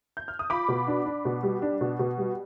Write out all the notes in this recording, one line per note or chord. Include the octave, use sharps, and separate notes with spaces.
G6
F6
D#6
F4 B5 D6
B2
D4
D4
B2
G3
D4
B2
B2
G3